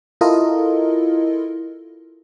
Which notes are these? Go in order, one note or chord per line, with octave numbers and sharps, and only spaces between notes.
E4 F4 A4 A#4 D#5